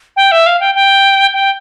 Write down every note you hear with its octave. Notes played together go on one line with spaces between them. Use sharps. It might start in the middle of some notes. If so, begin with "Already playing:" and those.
G5
E5
F5
G5
G5
G5